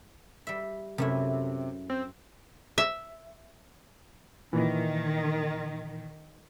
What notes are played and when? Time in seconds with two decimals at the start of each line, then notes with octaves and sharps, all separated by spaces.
0.47 G3 E5
0.98 F#2 C3 A3 E4
1.90 C4
2.78 E5
4.53 A#2 D#3 E3